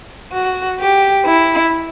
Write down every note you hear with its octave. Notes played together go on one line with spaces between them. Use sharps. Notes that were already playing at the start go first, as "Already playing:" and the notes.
F#4
G4
E4